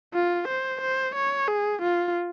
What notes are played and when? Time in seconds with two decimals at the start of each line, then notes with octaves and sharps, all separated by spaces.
0.14 F4
0.48 C5
0.81 C5
1.15 C#5
1.48 G#4
1.82 F4